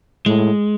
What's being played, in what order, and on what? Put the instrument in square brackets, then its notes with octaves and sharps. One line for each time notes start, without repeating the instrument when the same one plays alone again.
[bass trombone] A2 [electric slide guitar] G#3